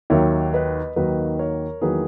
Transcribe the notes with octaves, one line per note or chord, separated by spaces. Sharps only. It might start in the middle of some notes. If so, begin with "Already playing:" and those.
D#2 D#3 F#3 A#3 C#5 E5
B4 D#5
D#2 D#3 F#3 A#3 B4 D#5
A#4 C#5
E2 D#3 F#3 A#3 G#4 B4